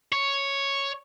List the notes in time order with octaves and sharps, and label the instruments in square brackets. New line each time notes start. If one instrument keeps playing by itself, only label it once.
[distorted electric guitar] C#5